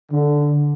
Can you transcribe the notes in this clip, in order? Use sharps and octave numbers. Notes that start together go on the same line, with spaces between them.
D3